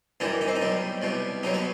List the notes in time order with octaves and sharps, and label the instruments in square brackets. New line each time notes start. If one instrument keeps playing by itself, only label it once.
[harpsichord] F#2 E3 G3 D#4
D#4
C4
D#4
B1 B2 G3
C2 B2 G3
B1 B2 F#3 D#4
B3